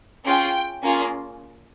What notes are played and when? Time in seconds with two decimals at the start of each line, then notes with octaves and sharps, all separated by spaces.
0.26 C#4 F4 G#4 G5
0.82 A#3 C#4 F4 G#4